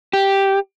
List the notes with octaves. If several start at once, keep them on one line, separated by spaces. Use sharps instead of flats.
G4